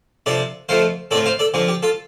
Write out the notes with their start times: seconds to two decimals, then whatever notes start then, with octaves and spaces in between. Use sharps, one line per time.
0.26 C3 F3 D4 A4 D5
0.69 F2 F3 A3 F4 C5 F5
1.11 A2 A3 C4 F4 A4 D5
1.26 C5 F5
1.39 A4 D5
1.54 D3 F3 C4 F4
1.68 G4
1.83 F4 A4